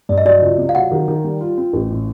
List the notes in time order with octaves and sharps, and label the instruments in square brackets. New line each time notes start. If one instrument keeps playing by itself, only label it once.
[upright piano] G2 [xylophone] D5
[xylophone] D#5
[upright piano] F#3 [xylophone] D5
[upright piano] C#2
C3
[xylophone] F5
[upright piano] F#3 [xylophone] F#5
[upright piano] D#3
D#3
G3
F4
C4
A1
A2